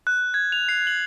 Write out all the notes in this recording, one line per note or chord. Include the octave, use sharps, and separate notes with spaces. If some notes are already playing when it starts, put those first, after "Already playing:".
F#6
G#6
F7
C7
F#7